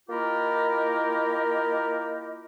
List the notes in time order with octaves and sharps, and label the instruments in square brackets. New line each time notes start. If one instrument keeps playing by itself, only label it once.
[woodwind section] A#3 E4 F4 G4 A#4 D#5